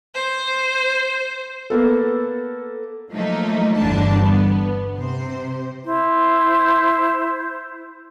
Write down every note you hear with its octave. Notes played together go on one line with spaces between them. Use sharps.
C5
A#3 B3 A4
F3 F#3 A3 A#3 D#4
G1 E2 G2 D3 D4 A5
B3
C3 C5
E4 C5